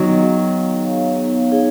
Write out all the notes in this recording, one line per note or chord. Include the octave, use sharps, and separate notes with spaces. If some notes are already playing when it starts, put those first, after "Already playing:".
Already playing: D#3 F#3 B3
D#4 G#4 C#5 F5
B3
D#4 G#4 C#5 F5
B3
D#4 G#4 C#5 F5